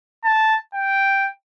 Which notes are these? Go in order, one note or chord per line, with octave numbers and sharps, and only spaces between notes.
A5
G5